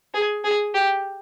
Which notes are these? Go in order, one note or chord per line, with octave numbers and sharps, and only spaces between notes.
G#4
G#4
G4